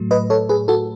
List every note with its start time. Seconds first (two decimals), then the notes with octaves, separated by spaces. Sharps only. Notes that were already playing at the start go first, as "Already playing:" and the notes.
Already playing: A2 F#3 A3
0.11 B4 D#5
0.30 A4 C#5
0.49 G#4 B4
0.68 F#4 A4